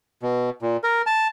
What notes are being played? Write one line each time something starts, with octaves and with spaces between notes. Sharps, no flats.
B2
A#2
A#4
A5